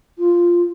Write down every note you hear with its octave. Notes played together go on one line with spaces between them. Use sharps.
F4